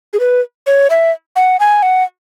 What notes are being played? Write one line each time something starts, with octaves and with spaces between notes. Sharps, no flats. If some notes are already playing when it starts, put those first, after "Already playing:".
G#4
B4
C#5
E5
F#5
G#5
F#5